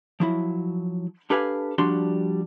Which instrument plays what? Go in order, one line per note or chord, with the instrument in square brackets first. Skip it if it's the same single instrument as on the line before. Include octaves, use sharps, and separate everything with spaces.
[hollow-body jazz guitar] F3 F#3 E4
D4 G4 A4 B4 F5 G#5
F3 G3 D4 F#4 C6